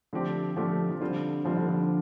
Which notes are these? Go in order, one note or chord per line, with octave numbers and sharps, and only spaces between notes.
D3 F3 A3 C4 G4
D3 F3 A3 C4 G4
F3
D3 G3 C4 F4 C5
F3 G3 C4 F4 C5
D3
F3